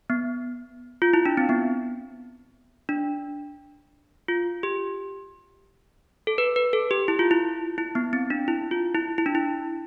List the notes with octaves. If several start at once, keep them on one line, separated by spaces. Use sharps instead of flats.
B3
F4
E4
D4
C4
B3
D4
F4
G4
A4
B4
B4
A4
G4
E4
F4
E4
E4
B3
C4
D4
E4
F4
E4
E4
D4
E4